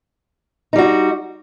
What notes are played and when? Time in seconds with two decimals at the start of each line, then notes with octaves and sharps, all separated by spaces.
0.73 D#4
0.76 G3
0.78 F#4